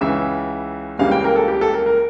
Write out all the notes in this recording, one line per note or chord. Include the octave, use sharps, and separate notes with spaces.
C#2 C#3 E3 E5
C#2 C#3 E3 G3 A#3 F5
G5
A#4
A4
G4
A4
A#4
A#4